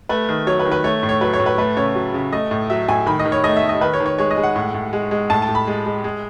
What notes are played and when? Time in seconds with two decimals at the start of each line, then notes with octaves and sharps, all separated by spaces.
0.09 A3 B4
0.29 D#3
0.47 F#3 C#5
0.59 B4
0.66 D#3
0.72 B4
0.84 A3 C#5
1.03 A2
1.09 C#5
1.21 F#3 B4
1.34 C#5
1.40 A2
1.46 B4
1.58 A3 B4
1.77 C#3 C#5
1.95 F#3
2.14 C#3
2.33 A3 D#5
2.51 A2
2.70 F#3 E5
2.89 A2 G#5
3.06 D#3 B5
3.19 D#5
3.25 D#3
3.32 C#5
3.44 A3 D#5
3.56 E5
3.62 A3
3.69 D#5
3.81 D#3 B4
3.94 C#5
4.00 D#3
4.06 C#5
4.18 G#3 C#5
4.31 D#5
4.37 G#3
4.43 F#5
4.56 A2
4.74 A2
4.93 G#3
5.11 G#3
5.30 A2 A5
5.42 A5
5.48 A2
5.55 B5
5.67 G#3
5.86 G#3
6.04 G#3